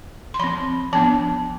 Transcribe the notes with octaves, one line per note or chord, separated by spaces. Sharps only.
C6
F3 C4 B5
F3 B3 D4 A5